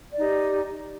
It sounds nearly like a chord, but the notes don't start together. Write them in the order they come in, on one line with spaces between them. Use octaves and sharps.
D5 D#4 G4